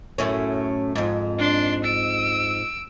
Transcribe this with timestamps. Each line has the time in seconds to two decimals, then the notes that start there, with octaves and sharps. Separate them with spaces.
0.18 F#2 A2 C#4
0.95 F2 G#2
1.39 D4 C6
1.84 E6 D7